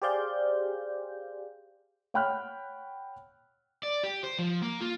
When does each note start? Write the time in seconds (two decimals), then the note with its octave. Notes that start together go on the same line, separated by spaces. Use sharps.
0.02 G4 G#4 C5 D5 F5 G6
2.14 C#5 F#5 G5 B5 F6 F#6
3.83 D5
4.04 G4
4.23 C5
4.39 F3
4.63 A#3
4.82 F4